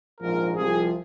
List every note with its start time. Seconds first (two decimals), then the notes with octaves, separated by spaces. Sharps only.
0.20 A#1 G#2 F3 A#4
0.56 C2 C3 F3 G#4